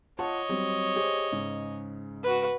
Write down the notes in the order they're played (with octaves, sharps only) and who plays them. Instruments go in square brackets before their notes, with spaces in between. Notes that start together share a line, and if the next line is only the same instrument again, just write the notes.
[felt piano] F4 F#5 A5 [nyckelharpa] C#5 D#5
[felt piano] F#3 G3 C4
G4 G#4 C5
G#2 C#3
[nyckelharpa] F#4 B4